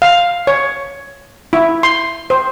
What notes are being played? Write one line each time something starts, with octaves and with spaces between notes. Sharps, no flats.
F5
C#5
E4
C6
C5